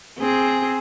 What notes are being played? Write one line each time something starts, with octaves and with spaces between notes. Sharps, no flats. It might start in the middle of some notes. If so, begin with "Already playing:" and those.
C4 G#4